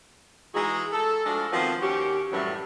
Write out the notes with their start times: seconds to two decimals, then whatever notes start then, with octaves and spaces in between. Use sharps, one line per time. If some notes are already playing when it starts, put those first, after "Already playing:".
0.54 E3 G#3 D#4 E4 F#4 G#4
0.92 A4
1.25 F3 G#3 A3 D4 F#4 F5
1.51 D#3 F3 F#3 B3 C4
1.82 D#2 C#4 F#4 G4
2.32 F#2 A2 E3 F#3 G3 A3